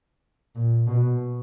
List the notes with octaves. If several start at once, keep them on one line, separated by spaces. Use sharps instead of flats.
A#2
B2